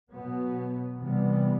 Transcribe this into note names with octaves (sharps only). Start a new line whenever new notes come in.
B2 F#3 B3
C3 E3 G3 B3